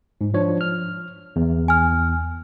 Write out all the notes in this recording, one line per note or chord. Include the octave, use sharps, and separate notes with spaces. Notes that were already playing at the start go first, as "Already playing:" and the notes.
G#2
F3 D4 C#5
F6
E2
G#5 F6